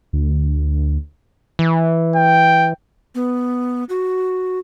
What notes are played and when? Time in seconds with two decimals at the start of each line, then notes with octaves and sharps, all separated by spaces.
0.13 D2
1.59 E3
2.16 G5
3.15 B3
3.89 F#4